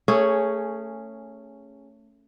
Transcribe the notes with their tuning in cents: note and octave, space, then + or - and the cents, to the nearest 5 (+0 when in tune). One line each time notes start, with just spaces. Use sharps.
A3 +20 C#4 +0 G#4 -5